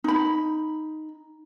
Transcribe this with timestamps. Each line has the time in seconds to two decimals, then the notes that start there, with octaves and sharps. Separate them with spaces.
0.04 D#4 B5